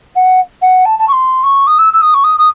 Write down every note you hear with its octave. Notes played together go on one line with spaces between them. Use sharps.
F#5
F#5
A5
A5
C#6
C6
C#6
D#6
E6
E6
D#6
C#6
D#6
D#6